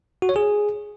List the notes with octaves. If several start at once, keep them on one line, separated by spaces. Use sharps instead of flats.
F#4
C#5
G#4